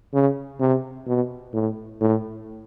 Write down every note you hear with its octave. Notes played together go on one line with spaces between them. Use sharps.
C#3
C3
B2
A2
A2